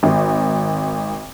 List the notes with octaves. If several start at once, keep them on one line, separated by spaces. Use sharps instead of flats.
G#1